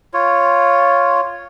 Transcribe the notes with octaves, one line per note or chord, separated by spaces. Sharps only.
F4 C#5